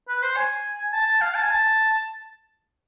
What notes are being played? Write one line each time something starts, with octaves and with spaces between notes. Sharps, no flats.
B4
C5
G#5
A5
A5
F5
A5
G#5
A5